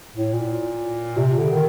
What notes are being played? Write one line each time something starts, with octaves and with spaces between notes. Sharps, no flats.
A2
A#2
C3
D3
D#3